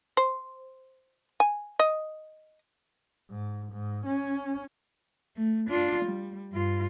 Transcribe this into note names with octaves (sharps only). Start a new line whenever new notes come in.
C5
G#5
D#5
G#2
G#2
C#4
A3
D4 F4
G3
G2 F4